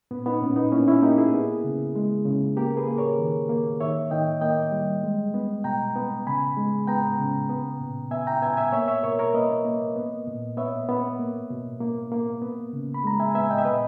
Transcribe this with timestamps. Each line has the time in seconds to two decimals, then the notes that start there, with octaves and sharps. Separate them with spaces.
0.11 A#2 B3
0.26 B3 D#4
0.41 A#2 C#4
0.56 B3 D#4
0.72 A#3 C#4 E4
0.88 C#4 E4
1.02 A#3 D#4 G4
1.18 E4 G#4
1.33 B3
1.64 C#3
1.96 G#3
2.25 C#3
2.57 A#3 G4 A#4
2.77 G#4 B4
2.88 A#3
2.98 A#4 C#5
3.19 D#3
3.49 A#3
3.80 D#3 C#5 E5
4.10 D#3 D#5 G5
4.41 A#3 D#5 G5
4.72 G3
5.04 G#3
5.34 B3
5.64 B2 G5 A#5
5.96 B3
6.27 C#3 G#5 B5
6.57 G#3
6.88 B3 G5 A#5
7.19 C#3
7.49 B3
7.80 A#2
8.11 B3 E5 G#5
8.27 G5 A#5
8.42 B3 E5 G#5
8.57 E5 G#5
8.72 A#3 C#5 E5
8.88 C#5 E5
9.03 B2 A#4 C#5
9.19 A#4 C#5
9.34 A#3 B4 D#5
9.65 A#3
9.96 B3
10.27 A#2
10.57 B3 C#5 E5
10.89 B3
11.19 A#3
11.50 B2
11.80 A#3
12.12 A#3
12.42 B3
12.73 C#3
12.94 B5
13.04 G#3 A#5
13.20 E5 G#5
13.34 B3 E5 G#5
13.50 D#5 G5
13.58 E5
13.65 A#2 B4 D#5